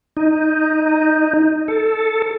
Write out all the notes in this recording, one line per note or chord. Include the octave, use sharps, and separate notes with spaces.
D#4
A4